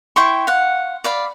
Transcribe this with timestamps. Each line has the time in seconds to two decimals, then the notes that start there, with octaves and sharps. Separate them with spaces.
0.16 E4 G5 C6 C#6
0.47 F5 F#5
1.04 D5 F5 B5